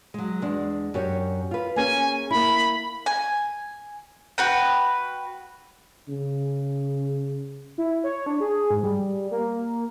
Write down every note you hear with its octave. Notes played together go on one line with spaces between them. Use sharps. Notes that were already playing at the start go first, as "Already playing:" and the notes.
F#3 G#3
E2 G#3 D4
F#2 G4 C#5
F4 B4
A#3 C#4 G#4 G#5
A#3 E4 B5
G#5
F#4 B4 G5
C#3
E4
C#5
D4
G#4
G#2
G3
A#3